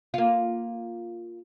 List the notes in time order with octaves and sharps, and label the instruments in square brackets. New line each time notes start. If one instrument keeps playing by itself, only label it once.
[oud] A#3 F4